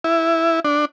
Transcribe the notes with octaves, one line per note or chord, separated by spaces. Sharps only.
E4
D4